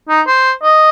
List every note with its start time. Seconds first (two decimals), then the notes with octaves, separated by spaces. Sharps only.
0.09 D#4
0.27 C5
0.63 D#5